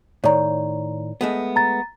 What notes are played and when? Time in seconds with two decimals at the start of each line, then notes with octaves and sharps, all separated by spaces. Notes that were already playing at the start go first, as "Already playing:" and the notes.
0.24 A2 D#3 C#5 D5 A#5
1.21 G#3 A3 B3
1.56 A#5 A6